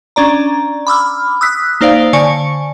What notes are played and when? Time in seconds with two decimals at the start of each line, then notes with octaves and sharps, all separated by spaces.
0.16 C#4 D4 D5 A#5
0.87 B5 D6 E6 F6
1.41 D#6 E6 F#6 B6
1.81 A#3 D#4 C5 D5 F5
2.13 D3 D5 G#5 C#6 C#7